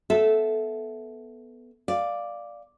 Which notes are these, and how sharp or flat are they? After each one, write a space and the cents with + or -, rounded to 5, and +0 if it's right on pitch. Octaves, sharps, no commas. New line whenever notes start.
B3 +0 A4 -15 E5 +0
D5 +0 F5 +0